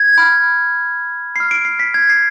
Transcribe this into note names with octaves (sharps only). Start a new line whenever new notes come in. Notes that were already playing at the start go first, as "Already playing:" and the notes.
Already playing: G#6
B5 F6
B5 F6 C7
D7
C7
B6
G#6
C7